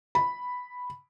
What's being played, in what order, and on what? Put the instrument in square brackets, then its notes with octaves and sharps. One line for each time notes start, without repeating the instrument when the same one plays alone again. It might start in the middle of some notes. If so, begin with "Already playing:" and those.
[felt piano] B5